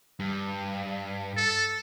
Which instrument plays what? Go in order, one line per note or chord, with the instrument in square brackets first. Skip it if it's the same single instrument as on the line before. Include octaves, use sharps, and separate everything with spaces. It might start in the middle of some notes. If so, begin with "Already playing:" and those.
[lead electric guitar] G2
[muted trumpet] A4